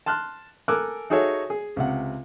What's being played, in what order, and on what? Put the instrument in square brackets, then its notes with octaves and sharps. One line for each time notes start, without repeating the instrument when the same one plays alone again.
[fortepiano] A5 C6 F6 F#6
A4 A#4 G#5 D6 E6 F#6
D#4 F#4 G#4 A4 C#5 E5
G#4
C#2 C3 F#5